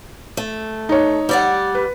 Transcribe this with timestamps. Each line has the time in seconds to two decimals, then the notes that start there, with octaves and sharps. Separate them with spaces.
0.37 A3
0.89 D#4 C#5
1.29 G3 D5 F#5
1.75 B4